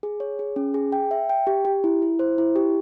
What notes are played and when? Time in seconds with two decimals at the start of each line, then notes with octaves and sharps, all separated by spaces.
0.03 G#4
0.20 C#5
0.39 G#4
0.56 C#4
0.74 G#4
0.92 G5
1.11 E5
1.29 G5
1.47 G4
1.65 G4
1.84 E4
2.02 E4
2.19 C5
2.38 E4
2.56 G4